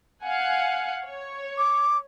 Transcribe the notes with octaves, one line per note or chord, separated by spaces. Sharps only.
F5 F#5 G#5
C#5
D6